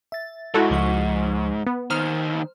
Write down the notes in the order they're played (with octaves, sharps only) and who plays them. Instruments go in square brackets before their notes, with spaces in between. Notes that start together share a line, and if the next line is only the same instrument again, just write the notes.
[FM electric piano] E5 A6
[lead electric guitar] G#2 [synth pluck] E4 F#4 A4
[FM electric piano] C#2 F3 C#6
[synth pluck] B3
[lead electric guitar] D#2 D#3 [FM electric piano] C5 [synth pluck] F6